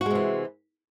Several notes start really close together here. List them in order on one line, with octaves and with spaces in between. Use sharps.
F#4 G#3 C3 E3